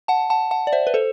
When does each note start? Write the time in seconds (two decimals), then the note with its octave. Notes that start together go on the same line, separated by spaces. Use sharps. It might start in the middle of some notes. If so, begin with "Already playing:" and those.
0.08 F#5 A5
0.30 F#5 A5
0.51 F#5 A5
0.67 D5
0.72 C5 E5
0.87 B4
0.94 A4 C5